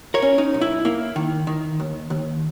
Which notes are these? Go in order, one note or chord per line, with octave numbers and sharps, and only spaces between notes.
A#4 C#5
C#4
D#4
B1
E4
A#3 E4
D#3
D#3
D#2
D#2